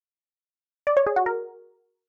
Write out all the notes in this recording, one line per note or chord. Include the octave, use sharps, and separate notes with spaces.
D5
C#5
G#4
F#4
A#4